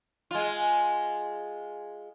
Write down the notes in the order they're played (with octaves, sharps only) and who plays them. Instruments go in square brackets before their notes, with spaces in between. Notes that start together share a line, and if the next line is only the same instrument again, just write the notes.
[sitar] G#3 F4